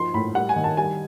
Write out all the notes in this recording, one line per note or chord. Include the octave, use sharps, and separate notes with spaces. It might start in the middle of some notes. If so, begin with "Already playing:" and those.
Already playing: F3 D#4 C6
A2 B5
G3 F#5
G#5
D#3
A5
G3 G#5